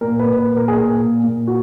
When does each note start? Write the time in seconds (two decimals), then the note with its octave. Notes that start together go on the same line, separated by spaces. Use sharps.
0.01 A#2 A#4
0.19 B4
0.25 A#2
0.38 B4
0.50 A#2
0.57 A#4
0.68 G#4
0.74 A#2 A#4
0.99 A#2
1.24 A#2
1.47 F#4